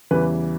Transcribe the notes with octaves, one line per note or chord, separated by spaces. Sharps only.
E2 C#3 E3 G3 B4